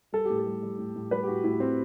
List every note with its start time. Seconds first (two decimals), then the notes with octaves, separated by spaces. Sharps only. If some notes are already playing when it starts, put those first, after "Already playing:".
0.12 G3 A4
0.25 A2 G4
0.39 A4
0.46 G3
0.63 G3
0.78 A2
0.96 A2
1.11 G3 B4
1.23 G4
1.28 A2 F#4
1.44 A2 E4
1.60 A2 C4